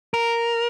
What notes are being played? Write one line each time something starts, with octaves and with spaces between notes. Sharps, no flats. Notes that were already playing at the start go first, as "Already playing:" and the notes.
A#4